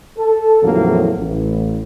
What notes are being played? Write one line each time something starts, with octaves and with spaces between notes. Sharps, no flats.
A4
E2 A2 C#3 F3 F#3 A#3
A1